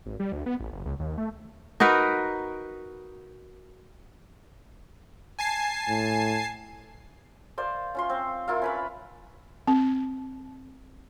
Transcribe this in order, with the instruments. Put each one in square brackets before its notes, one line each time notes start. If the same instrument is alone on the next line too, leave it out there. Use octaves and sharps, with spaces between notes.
[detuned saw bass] G#1
G3
D2
B3
A1
F#1
C#2
D#2
A3
[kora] D#4 F#4 A#4 B4
[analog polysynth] G#5 A5 C7
[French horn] A2
[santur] C5 D5 F5
C#4 F4 C6
C4
E4 F4 A#4 F5
C#4 B4 B5
[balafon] C4